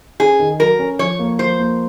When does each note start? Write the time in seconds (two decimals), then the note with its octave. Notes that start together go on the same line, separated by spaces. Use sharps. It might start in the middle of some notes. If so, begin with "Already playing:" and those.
0.19 C#4 G#4
0.39 D#3
0.60 F#3 A#4
0.79 C#4
0.99 F3 C#5
1.19 A#3
1.39 F3 C5
1.59 A#3